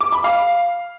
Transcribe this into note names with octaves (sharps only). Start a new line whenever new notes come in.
D6
B5
F5